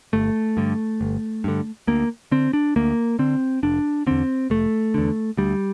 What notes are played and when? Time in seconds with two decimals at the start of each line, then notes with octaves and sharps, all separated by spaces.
0.13 G1 A3
0.57 G2 D3
1.01 G1
1.44 G2 D3
1.87 D2 A#3
2.32 D3 C4
2.53 D4
2.76 D2 A#3
3.19 D3 C4
3.63 F1 D4
4.07 E2 D3 C4
4.50 F1 A3
4.94 E2 D3
5.37 D2 G3